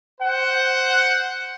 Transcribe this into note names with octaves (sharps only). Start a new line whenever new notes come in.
C5 F#5